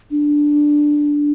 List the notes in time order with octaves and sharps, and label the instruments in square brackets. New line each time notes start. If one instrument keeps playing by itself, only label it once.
[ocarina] D4